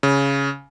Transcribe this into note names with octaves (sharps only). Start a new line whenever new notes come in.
C#3